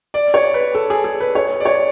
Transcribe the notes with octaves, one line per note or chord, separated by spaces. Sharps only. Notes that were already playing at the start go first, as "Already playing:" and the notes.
D5
C#5
B4
A4
G#4
G#4
B4
C#5
D5
C#5